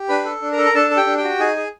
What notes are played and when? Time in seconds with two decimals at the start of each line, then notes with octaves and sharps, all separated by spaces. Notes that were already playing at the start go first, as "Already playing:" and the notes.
Already playing: G4
0.09 D4 B4 B5
0.25 A4
0.42 D4
0.52 A#4 A#5
0.57 A4
0.65 A#5
0.74 D4 A4 A5
0.91 A4
0.97 G4 G5
1.07 D4
1.18 G4 G5
1.24 F#4
1.40 D#4 G#4 G#5
1.56 G#4